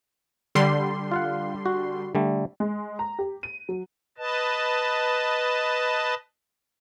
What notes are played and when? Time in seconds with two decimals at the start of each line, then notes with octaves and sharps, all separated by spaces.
0.55 D3 G3 C6
1.11 F4 F5 F#5
1.66 F#4
2.15 D3 G3 A3
2.60 G#3
2.99 A#5
3.19 G4
3.43 D#7
3.69 F#3
4.18 B4 D#5 A5